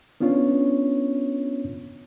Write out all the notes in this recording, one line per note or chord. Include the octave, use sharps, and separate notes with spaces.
B3 C#4 D4 F4 C#5